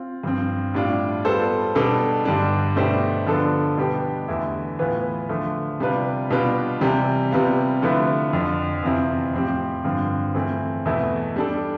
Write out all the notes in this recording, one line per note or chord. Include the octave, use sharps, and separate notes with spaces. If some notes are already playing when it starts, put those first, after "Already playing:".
Already playing: C4 F4
G2 F3 C4
A2 G3 D4 F4
G3 B3 F4 A4 C5
B2 G3 D4 A4
G2 D3 G3 D4
B2 A3 D4 G4 C5
D3 F3 B3 D4 A4
B2 G3 B3 D4 G4
E2 D3 A3 E4
A2 E3 B3 F4 B4
D3 F3 A3
C3 G3 D4 F4 B4
B2 G3 D4 F4 B4
C3 E3 G3
C3 G3 B3 F4
D3 F3 A3 E4 B4
F2 D3 F3
E2 C3 F3 C4 E4
A2 F3 C4 G4 C5
G2 D3 F3 C4
E3 A3 C4 F4
E2 B2 A3 E4
G3 D4 A4